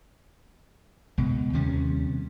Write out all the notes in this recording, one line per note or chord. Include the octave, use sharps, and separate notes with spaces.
C#2 B2
D#2 C3 G3 C#4